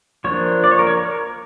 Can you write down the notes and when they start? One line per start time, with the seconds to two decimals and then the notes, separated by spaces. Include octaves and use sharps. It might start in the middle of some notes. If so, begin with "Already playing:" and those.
0.24 F3 A#3 D4 C#5
0.64 D5
0.71 C#5
0.79 A#4
0.87 C#5
1.03 A#4